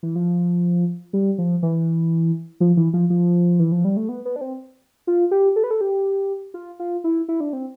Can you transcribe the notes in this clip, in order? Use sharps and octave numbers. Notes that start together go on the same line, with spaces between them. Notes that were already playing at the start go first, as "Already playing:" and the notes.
E3
F3
G3
F3
E3
F3
E3
F3
F3
E3
F3
G3
A3
B3
B3
D4
C4
F4
G4
A4
B4
A4
G4
F4
F4
E4
E4
D4
C4